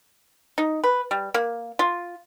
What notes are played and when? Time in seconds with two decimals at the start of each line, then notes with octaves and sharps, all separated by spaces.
0.58 D#4
0.84 B4
1.11 G3
1.34 A#3
1.79 F4